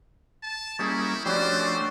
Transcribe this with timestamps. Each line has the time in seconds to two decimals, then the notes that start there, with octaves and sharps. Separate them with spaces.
0.43 A5
0.79 G3 A#3 C#4 E4 G#4 D#5
1.25 F3 G3 A3 C#4 D4 F#4 C5
1.59 D5 G#5 C#6